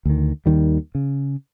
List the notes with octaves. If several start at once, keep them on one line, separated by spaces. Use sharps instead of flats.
D2 D#3
D#2 D#3 G3
C#3